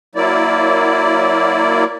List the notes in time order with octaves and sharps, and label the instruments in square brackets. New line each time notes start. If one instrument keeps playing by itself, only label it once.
[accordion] F#3 A#3 E4 D5